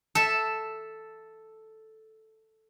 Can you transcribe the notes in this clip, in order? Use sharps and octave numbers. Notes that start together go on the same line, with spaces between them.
A4 E5